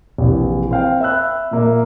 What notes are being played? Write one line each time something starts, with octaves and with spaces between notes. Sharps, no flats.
A#1 C3 E3
C4 F5 G5
E5 B5 E6 F#6
A#2 A#3 E5